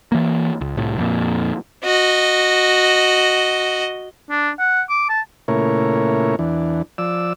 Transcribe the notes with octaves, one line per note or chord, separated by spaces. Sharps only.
E3 A#3
C#2
C2 A2
F2 A#2
F#4 D#5
D4
F#5
D6
A5
A#2 C#3 A3 E4 A#4 C#5
E2 E3 D4
F3 D5 E6